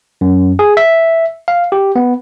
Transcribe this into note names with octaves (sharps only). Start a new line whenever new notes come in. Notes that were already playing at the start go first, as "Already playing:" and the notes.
F#2
G#4
E5
F5
G4
B3